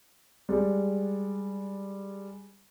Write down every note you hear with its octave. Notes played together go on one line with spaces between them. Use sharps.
G3 G#3